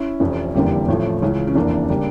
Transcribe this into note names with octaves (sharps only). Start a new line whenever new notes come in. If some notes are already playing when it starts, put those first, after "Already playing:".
Already playing: C#4 E4
F1 F2 E3
F1 E2 D3 G3 A#3
A1 A2 F3 A3
C#2 C#3 E3 C#4
C#4
F1 E2 E3 A#3 D4
C#3 G3 A#3